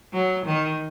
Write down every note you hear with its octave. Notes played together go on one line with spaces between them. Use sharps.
F#3
D#3